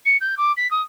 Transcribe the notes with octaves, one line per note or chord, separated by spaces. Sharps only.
C#7
G6
D6
B6
D#6